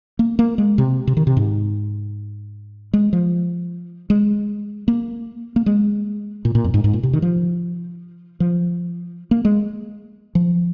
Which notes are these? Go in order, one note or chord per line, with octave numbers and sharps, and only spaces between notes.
A#3
A#3
G#3
C3
C3
D#3
C3
G#2
G#3
F3
G#3
A#3
A#3
G#3
A#2
A#2
F2
G#2
G#2
A#2
C3
D#3
F3
F3
A#3
G#3
F3